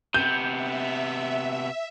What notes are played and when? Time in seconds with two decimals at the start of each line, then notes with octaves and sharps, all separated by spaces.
0.14 C3 B3 G6
0.50 E5